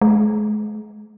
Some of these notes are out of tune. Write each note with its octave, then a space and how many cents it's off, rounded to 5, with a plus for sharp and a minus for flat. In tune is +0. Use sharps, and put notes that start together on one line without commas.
G#3 +35